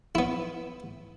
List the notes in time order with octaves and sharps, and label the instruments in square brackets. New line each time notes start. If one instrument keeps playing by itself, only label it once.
[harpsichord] B3 E4